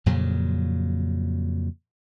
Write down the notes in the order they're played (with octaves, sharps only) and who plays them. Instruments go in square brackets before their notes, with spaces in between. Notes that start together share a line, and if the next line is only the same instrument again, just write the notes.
[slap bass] F2 A#2 C#3 F#3